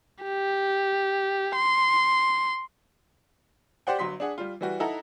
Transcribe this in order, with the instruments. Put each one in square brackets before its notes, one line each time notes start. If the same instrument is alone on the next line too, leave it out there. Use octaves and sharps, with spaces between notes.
[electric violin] G4
C6
[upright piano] G4 C5 D5 F#5 G5
G1 F#3 C6 B6
D4 G#4 F#5
G3 F4
E3 G3 F#4
D#4 E4 A4 F#5 A#5